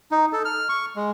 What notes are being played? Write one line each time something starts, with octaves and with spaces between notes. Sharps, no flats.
D#4
A4
F6
C#6
G#3